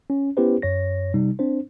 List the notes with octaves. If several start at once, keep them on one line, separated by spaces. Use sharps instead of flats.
C#4
B3 C#4 E4 G4 B4 C5
F#2 C#5 A#6
C3 G3 D#4
C4 D4 C5